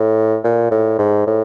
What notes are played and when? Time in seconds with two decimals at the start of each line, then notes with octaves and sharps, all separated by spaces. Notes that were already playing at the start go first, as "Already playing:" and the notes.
Already playing: A2
0.44 A#2
0.71 A2
0.99 G#2
1.27 A2